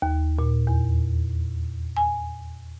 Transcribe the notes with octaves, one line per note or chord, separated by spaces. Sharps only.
D#2
A#2
E2
G#5